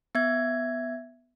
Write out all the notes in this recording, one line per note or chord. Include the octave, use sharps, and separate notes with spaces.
B3 E5 G#6